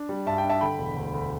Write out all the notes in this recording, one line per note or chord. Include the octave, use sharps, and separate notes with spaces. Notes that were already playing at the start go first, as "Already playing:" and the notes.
Already playing: D4
G3
G2 E5 A5
G5
D4
E5 A5
D3 G5 B5
E1
D2
D2